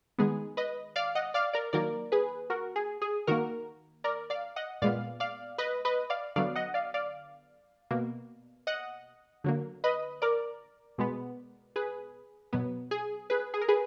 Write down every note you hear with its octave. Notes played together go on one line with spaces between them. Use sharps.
D#3 G#3 B3 G#4
B4 D#5
D5 F5
D#5 F#5
D5 F5
A#4 D5
D#3 F#3 A#3 A#4 D5
G#4 B4
F#4 A#4
G#4
G#4
D#3 A#3 F#4 A#4
A#4 D5
D5 F5
D#5 F#5
A#2 G#3 B3 D5 F5
D5 F5
B4 D#5
B4 D#5
D5 F5
D3 F#3 B3 D5 F5
D#5 F#5
D5 F5
D5 F5
B2 A#3
D#5 F#5
D3 F#3 A#3
B4 D#5
A#4 D5
B2 G#3 B3
G#4 B4
B2 F#3 B3
G#4
G#4 B4
G#4
A#4
G#4 B4